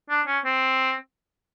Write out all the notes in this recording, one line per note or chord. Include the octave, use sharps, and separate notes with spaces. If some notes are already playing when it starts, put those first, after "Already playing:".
D4
C#4
C4